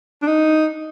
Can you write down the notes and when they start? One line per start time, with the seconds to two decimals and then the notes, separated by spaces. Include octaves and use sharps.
0.22 D4
0.27 D#4